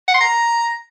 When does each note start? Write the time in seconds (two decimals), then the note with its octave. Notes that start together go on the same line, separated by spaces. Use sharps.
0.08 F#5
0.14 C6
0.21 A#5